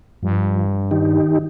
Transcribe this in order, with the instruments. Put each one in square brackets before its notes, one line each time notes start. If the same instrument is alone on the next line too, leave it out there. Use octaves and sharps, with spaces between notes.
[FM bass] G2 [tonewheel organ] F3
[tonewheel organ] D#3 D#4 G4